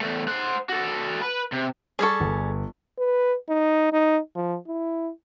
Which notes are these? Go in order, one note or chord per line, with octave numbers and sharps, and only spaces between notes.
E2 A3
C5 F#5
F#4 A4
B4
C3
G3 G#4 A4 G#5 C#6
G1
B4
D#4
D#4
F3
E4